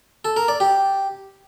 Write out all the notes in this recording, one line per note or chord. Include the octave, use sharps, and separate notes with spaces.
A4
A#4
D5
G4